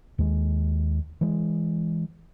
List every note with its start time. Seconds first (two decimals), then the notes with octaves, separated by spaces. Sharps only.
0.18 D#2 G#3
1.21 E3 G#3